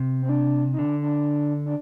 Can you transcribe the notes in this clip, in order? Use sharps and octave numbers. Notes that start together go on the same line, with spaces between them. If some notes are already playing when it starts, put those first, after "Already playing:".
Already playing: C3
C4
D4
D#4
D3 D4
D4
D4